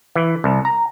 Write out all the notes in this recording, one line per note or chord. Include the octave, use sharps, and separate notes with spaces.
E3
C2
A#5